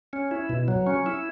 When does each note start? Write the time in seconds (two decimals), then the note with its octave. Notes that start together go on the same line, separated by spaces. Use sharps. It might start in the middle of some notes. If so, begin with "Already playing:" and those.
0.13 C#4
0.31 E4
0.49 B2
0.68 F#3
0.87 C#4
1.06 E4